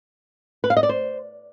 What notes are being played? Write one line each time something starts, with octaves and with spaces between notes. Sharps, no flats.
B4
F5
D#5
D5
C5